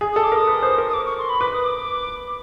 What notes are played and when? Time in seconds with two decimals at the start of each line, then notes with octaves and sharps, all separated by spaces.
0.01 G#4
0.12 A4 D#6
0.24 D6
0.32 A#4 D#6
0.47 B4
0.63 C5
0.78 A#4
0.89 D#6
0.93 D6
1.05 C#6
1.18 C6
1.29 B5
1.40 B4 D6
1.53 D#6
1.64 D6